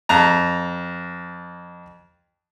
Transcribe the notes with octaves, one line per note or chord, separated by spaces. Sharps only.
F2 A#5